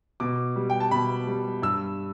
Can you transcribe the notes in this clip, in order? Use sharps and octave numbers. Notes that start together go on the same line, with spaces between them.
B2 D6
G3
G5
A5
B2 B5
G3
G2 E6